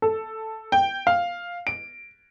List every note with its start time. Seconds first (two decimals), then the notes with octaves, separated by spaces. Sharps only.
0.02 A4
0.72 G5
1.07 F5
1.67 D7